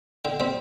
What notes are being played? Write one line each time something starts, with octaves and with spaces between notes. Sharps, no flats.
D3 G5
G3 C4 G5